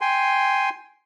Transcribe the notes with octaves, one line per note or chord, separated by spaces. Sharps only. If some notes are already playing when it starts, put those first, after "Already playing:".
G5 G#5 C6